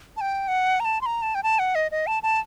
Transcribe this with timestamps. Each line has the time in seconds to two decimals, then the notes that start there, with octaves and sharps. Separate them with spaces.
0.17 A5
0.21 G5
0.48 F#5
0.80 A#5
0.85 A5
1.01 C6
1.06 A#5
1.22 A5
1.35 G5
1.43 A5
1.59 F#5
1.75 D#5
1.91 D#5
2.07 A5
2.23 A5